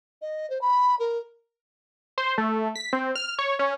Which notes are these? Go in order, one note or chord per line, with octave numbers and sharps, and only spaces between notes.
D#5
C5
B5
A#4
C5
A3
B6
C4
F6
C#5
C#4